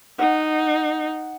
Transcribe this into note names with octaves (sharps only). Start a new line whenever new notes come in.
D#4 F#5